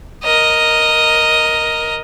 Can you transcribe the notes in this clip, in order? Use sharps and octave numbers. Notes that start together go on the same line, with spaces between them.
A#4 D#5